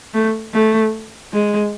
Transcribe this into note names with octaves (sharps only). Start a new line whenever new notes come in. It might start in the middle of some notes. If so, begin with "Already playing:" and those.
A3
A3
G#3